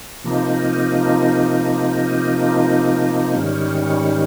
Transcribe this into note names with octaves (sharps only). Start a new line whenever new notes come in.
C3 F3 A#3 D#4
G#2 D#3 G3 C#4